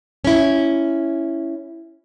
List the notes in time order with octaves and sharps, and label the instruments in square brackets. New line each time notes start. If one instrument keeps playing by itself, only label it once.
[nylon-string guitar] C#4 E4